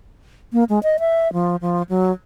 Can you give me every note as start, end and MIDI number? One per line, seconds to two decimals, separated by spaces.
0.53 0.64 58
0.69 0.79 56
0.83 0.97 75
0.99 1.31 76
1.33 1.56 53
1.61 1.82 53
1.89 2.12 54